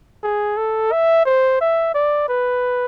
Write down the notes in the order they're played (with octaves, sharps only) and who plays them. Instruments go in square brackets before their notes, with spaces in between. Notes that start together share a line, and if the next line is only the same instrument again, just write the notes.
[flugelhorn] G#4
A4
E5
C5
E5
D5
B4